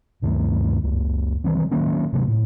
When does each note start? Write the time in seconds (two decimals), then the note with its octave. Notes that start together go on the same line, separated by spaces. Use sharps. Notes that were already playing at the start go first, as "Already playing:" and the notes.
0.22 D2 G2 D#3 A3
0.84 C#2 F#2
1.44 D#3 E3 G3 C4
1.71 D#3 F#3 A#3 C#4
2.12 G1 C3 F#3 A3
2.28 A2